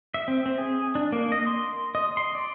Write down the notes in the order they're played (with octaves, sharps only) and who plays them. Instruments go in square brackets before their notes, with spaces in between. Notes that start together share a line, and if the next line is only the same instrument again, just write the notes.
[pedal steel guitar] E5
C4
C4
G#4
D4
A#3
D#5
C6
D#5
C6
D5